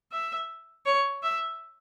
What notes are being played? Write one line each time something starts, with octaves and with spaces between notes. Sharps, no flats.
E5
C#5
E5